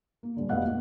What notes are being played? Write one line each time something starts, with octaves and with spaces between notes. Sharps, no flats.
A#3
D#1 D3
F1 B2 D#5 F5 F#5 F#6
A#2